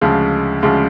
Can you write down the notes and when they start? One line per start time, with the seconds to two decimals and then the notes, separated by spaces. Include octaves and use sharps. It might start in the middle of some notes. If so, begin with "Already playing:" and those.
0.01 D2 C#3 F3 G#3
0.62 D2 C#3 F3 G#3